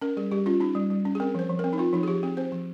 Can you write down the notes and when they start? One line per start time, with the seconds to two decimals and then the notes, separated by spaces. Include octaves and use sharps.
0.01 C#4 A#4
0.17 G3 G#4
0.31 G3 G4
0.46 C#4 F4
0.60 C#4 D#4
0.75 G3
0.90 G3
1.05 C#4
1.15 G#4
1.20 C4 A#4
1.35 F3 C5
1.50 F3
1.59 A#4
1.64 C4
1.73 D#4
1.78 C4 F4
1.93 F3 D#4
2.03 G#4
2.08 F3 G4
2.23 C4 G#4
2.37 C4 C5
2.52 F3